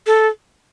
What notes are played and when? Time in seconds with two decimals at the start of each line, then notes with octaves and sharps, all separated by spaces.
0.07 A4